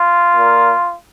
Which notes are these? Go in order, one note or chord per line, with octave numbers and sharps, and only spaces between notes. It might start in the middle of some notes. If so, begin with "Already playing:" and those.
Already playing: F4
A#2 A#3